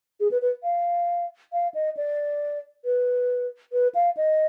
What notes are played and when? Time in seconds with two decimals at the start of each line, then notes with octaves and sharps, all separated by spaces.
0.20 G#4
0.31 B4
0.42 B4
0.63 F5
1.53 F5
1.74 D#5
1.97 D5
2.85 B4
3.73 B4
3.95 F5
4.17 D#5